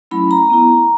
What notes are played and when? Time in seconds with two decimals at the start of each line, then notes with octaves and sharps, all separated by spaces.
0.11 F#3 A3 C#4 E4 B5
0.31 A#5
0.50 B3 E4